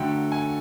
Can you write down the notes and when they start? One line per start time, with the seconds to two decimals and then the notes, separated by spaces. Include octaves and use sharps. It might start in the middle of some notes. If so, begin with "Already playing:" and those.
Already playing: D3 F#3 A3 G5
0.32 G#5